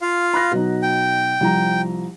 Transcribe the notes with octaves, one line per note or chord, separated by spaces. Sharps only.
F4 F5
B5 F#6 A#6
B2 F#3 D#4
G5
C2 F3 A#5